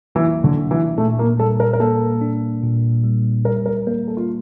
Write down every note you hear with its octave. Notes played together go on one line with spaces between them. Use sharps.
E3 A#3
D3
D4
E3
A#2 A3
A#3
G3 A4
A#4
A#4
A#3 A4
D4
A#2
G3
G3 A#4
A#4
A#3 A#4
A4
F4